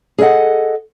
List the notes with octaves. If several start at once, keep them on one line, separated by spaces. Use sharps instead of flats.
G#4 A4 D5 D#5 F#5